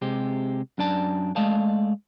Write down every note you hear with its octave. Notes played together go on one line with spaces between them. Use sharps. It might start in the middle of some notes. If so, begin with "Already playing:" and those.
C3 G#3 C4 G4
F#2 D4 D5 A5
G#3 A3 D5 D#5 F5 A5